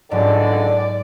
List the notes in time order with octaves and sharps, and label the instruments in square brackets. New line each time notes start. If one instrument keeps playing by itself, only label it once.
[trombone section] C#2 D3 [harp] G#2 F#3 [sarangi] D5